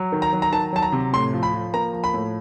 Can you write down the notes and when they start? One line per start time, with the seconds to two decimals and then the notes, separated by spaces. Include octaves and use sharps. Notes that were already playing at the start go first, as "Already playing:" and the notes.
Already playing: F#3
0.12 D#3
0.22 A#5
0.33 F#3
0.42 A#5
0.53 D#3 A5
0.73 F#3 A5
0.82 A#5
0.92 C3
1.13 A2 C6
1.33 F3
1.43 B5
1.54 F3
1.74 A#3 A#5
1.93 F3
2.04 B5
2.14 A2